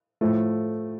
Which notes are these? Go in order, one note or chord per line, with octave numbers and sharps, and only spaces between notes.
A2 F3 A3